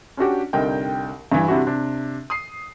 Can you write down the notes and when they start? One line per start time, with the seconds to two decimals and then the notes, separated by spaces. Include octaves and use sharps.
0.17 C#4 D4 F#4 G4
0.53 C2 D3 D#4 A#4 G5
1.32 G2 E3
1.48 C3 G3 D4 E4 F#4
1.67 C3 D4
2.30 D#6 C7